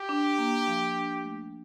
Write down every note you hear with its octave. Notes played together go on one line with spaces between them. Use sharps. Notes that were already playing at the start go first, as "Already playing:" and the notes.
Already playing: G4
D4
A#3
F3
D4
A3